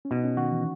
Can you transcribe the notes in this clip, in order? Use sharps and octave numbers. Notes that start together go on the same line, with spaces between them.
C#4
B2 D#4
C#4
D#3 F#4
E3